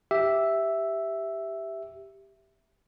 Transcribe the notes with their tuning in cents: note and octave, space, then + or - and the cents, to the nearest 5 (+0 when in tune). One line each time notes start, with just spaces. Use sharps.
G4 +0 E5 +0